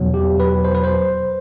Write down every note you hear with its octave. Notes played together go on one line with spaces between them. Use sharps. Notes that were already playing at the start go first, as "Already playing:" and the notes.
Already playing: E2 B2 F#3
G4
B4
C5
B4
C5